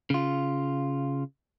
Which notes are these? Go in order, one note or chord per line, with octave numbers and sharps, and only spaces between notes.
C#3 F4